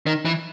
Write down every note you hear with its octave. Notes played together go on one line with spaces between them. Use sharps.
D#3
E3